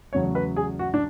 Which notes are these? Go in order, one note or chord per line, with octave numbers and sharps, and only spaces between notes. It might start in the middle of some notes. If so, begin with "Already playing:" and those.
E2 C#3 F#3 A3 C#5
B4
G#4
F#4
D4